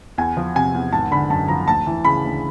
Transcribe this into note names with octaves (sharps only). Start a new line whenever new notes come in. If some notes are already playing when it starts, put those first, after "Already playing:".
E2 G#5
F3
C3 G#5
E2
G#1 A5
D3 B5
F#2 A5
F3 A#5
D2 A5
E3
C#3 B5
D2